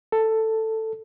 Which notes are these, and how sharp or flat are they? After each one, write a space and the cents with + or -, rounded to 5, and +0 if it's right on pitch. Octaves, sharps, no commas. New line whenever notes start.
A4 +10